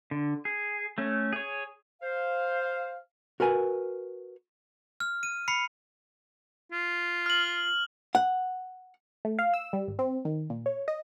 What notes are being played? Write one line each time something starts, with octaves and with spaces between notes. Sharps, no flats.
D3
G#4
A3 C#4
G#4 C#5
C5 F5
F#4 A#4 B4 G#5
F6
D#7
B5 C7 C#7
F4
F6 F#7
F#5
A3
F5
E6
G3
G#1
C4
D#3
A#2
C#5
D#5